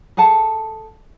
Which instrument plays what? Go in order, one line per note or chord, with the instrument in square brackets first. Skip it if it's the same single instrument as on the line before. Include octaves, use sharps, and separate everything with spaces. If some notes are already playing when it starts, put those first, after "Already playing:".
[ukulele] G#4 A4 F#5 A5